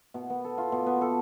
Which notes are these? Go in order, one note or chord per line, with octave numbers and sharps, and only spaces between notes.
B2
B3
A4
F4
B2
B3
A4